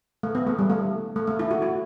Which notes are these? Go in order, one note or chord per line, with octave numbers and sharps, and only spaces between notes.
A3
B3
A3
G3
A3
A3
A3
E4
F#4
F#4